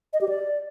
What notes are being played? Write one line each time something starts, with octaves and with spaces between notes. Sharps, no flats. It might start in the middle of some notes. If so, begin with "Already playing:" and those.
D#5
G4
D5